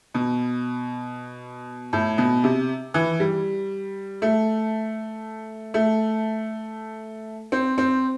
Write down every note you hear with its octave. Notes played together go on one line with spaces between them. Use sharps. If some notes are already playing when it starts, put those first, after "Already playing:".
B2
A2
B2
C3
E3
G3
A3
A3
C4
C4